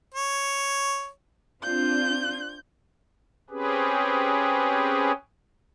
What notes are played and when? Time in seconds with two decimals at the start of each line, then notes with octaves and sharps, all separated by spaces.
0.14 C#5
1.63 C4 D4 F4 G6
3.50 C4 C#4 G4 G#4 B4